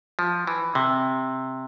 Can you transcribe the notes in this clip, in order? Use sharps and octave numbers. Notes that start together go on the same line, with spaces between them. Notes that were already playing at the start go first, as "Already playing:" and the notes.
F3
E3
C3